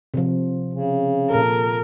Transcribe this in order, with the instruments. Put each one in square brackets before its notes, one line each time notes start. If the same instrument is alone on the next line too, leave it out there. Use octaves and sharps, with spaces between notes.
[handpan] C3 F3
[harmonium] C#3
[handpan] A#2 A4 [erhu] A#4